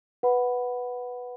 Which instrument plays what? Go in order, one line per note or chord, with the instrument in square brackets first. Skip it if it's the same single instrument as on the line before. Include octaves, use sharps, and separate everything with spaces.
[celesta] B4 F#5 B5